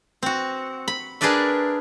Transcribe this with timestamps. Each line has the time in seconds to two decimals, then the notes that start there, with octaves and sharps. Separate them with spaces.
0.23 C4 F#4
0.88 B5
1.21 D4 G#4 A#4 B4 D5 E5